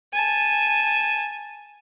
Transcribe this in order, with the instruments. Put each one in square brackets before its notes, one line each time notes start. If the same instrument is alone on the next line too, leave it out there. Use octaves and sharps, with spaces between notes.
[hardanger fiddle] G#5 A5